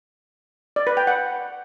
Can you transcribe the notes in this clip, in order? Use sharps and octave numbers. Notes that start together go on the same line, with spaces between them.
D5
B4
G5
F#5